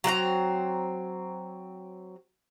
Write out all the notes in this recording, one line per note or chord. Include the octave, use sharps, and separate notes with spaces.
F#3 C4 F#5 A#5